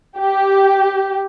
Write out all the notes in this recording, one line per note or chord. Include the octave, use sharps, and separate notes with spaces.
G4